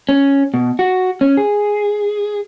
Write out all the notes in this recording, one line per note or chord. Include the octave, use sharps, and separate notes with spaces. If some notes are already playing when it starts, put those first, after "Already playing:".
C#4
B2
F#4
C#4
G#4